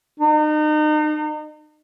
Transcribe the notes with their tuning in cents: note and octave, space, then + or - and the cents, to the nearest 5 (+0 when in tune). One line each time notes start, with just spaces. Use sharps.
D#4 -35